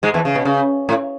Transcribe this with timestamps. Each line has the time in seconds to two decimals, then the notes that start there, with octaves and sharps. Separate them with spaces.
0.03 G#2 G#3
0.14 E2 E3
0.25 C#3
0.35 B2
0.45 C#3
0.89 A2